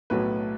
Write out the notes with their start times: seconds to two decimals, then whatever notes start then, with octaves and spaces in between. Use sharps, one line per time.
0.10 B1 A2 F#3 B4